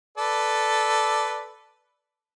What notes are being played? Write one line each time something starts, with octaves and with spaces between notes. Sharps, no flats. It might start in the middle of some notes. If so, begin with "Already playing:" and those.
A4 B4 D5